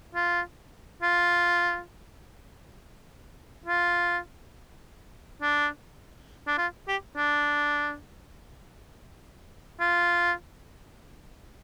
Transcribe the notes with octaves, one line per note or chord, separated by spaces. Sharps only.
F4
F4
F4
D4
D4
F4
G4
D4
F4